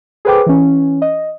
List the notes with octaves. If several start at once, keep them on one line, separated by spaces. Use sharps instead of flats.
G#4 A4 B4 C5 G5 D6
E3 C#4
D#5